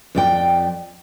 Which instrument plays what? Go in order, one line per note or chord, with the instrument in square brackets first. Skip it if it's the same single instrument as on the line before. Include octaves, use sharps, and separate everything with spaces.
[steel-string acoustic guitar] F2 D5 G5